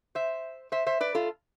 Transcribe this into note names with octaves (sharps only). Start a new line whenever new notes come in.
C5 E5
C5 E5
C5 E5
B4 D5
F4 A4